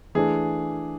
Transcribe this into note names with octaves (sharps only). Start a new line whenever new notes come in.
E3 A3 D4 G#4